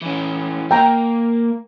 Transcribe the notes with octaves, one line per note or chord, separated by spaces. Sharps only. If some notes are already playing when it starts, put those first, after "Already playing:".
E3 C#4
A#3 G5 A#5